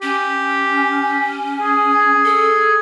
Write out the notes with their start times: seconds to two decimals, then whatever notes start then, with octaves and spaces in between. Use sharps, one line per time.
0.02 C#4 G4
1.60 G#4
2.24 A4